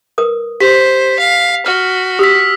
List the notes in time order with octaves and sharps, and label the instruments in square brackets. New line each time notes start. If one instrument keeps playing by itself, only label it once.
[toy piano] A#4 B4 D#6
[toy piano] G4 [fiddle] C5 [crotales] B6
[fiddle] F5
[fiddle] F#4 [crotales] F6
[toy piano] G4 [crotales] D#6 E6 B6